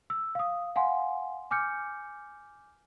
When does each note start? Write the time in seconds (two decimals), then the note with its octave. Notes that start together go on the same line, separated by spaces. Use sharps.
0.10 E6
0.35 F5 D#6
0.76 F5 F#5 G#5 C6
1.51 G#5 D6 F6 G6 C#7